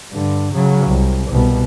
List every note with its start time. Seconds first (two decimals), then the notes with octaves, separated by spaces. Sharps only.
0.10 G2 D3
0.54 C#3 F#3
0.87 C2
1.31 C2 B2